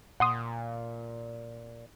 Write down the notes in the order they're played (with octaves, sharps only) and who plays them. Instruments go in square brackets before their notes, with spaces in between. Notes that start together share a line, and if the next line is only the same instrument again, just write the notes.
[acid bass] A#2 [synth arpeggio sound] F#5 C6 D#6